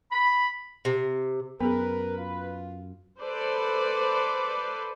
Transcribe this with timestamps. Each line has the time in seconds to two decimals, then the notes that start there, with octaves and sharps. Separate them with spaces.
0.12 B5
0.85 C3
1.60 F#2 B3 G#4 A#4 B4
2.18 F4
3.22 A4 B4 C5 D5